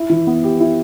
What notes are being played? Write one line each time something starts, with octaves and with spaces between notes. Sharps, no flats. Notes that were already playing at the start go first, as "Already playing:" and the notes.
Already playing: E4
E3
B3
G4
E4